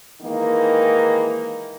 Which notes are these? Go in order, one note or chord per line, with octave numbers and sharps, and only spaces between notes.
D#3 E3 G#3 A#3 D#4 A#4